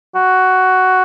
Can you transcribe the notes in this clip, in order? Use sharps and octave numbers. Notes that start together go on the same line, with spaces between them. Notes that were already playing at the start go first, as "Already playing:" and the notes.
F#4